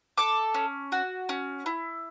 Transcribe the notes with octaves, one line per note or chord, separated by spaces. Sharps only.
A4 D6
C#4
F#4
C#4
E4